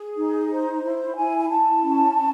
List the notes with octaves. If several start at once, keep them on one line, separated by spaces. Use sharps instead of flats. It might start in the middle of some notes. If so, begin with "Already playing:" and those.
Already playing: G#4
D#4
C5
E4
E4 G#5
G#5
E4 A5
C#4
C#4